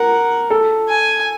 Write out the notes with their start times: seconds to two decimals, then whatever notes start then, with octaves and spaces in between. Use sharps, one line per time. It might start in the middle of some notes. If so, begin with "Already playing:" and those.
Already playing: A#4 F#5
0.50 A4
0.88 G#5